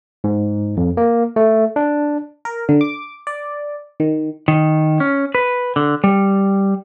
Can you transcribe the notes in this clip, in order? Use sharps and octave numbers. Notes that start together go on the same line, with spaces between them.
G#2
F2
A#3
A3
D4
A#4
D3
D6
D5
D#3
D#3
C#4
B4
D3
G3